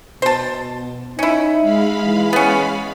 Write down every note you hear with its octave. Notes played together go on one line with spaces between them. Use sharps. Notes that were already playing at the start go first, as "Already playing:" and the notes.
B2 C5 A5
C#4 D#4 E4
G#3 F5 B5
E3
B3 C#4